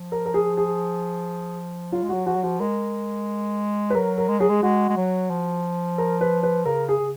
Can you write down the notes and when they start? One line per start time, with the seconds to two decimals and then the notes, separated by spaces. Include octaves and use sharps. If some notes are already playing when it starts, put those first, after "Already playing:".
Already playing: F3
0.12 A#4
0.26 A#4
0.34 G#4
0.57 G#4
1.92 F#3 F4
2.02 G#3
2.09 F#3 F#4
2.26 F3 F#4
2.35 F#3
2.43 F3 F#4
2.60 G#3 A#4
3.90 B4
3.95 F#3 A#4
4.18 A#4
4.28 G#3
4.39 F#3 G#4
4.49 G#3
4.63 G#3 F#4
4.89 G#3
4.97 F#3
5.30 F3
5.98 A#4
6.21 B4
6.43 B4
6.66 C#3 A#4
6.89 G#4
7.00 C#3